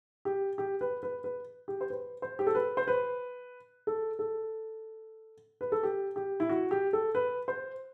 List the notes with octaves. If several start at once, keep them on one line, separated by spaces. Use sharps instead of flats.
G4
G4
B4
B4
B4
G4
C5
B4
C5
G4
A4
B4
C5
B4
A4
A4
B4
A4
G4
G4
E4
F#4
G4
A4
B4
C5